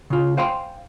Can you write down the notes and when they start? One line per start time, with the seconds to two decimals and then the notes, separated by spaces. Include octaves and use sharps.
0.10 C#3 F4
0.37 C5 F5 G5 G#5 C6